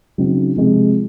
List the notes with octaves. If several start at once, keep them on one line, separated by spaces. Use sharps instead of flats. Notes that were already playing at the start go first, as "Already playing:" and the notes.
C#3 F#3 C4 D#4
C3 F3 G#3